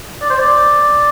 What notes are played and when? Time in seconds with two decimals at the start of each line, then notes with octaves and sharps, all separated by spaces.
0.22 D5
0.30 C5
0.39 D5